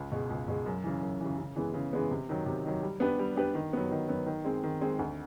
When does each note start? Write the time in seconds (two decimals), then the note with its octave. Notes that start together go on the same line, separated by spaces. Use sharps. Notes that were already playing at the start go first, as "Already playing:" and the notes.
Already playing: C#2
0.12 B2 G#3
0.30 C#2
0.48 B2 G#3
0.66 F#2
0.84 C#3 E3
1.02 F#2
1.20 C#3 E3
1.38 C#3
1.56 E3 G#3 B3
1.74 C#3
1.93 E3 G#3 B3
2.11 C3
2.29 D#3 F#3
2.46 C3
2.65 D#3 F#3
2.83 G3
3.00 B3 D4 G4 B4
3.19 G3
3.36 B3 D4 G4 B4
3.55 D#3
3.73 F#3 B3
3.91 D#3
4.08 F#3 B3
4.26 D#3
4.45 G#3 C4
4.63 D#3
4.81 G#3 C4
4.99 D2